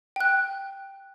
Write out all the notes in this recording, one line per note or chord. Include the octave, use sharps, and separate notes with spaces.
G5 F#6